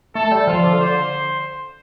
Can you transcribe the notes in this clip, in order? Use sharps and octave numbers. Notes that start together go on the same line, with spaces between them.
A3 A4
G3
F3 F4
D3
D3 C5